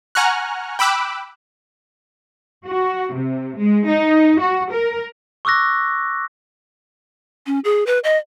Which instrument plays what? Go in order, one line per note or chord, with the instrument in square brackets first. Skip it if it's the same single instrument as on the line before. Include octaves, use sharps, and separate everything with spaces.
[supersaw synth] F#5 G#5 A#5 C#6 F6 F#6
G5 B5 D6 E6 F#6
[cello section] F#4
C3
G#3
D#4
F#4
A#4
[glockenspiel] C#6 D6 E6 F#6 A#6
[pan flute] C#4
G#4
B4
D#5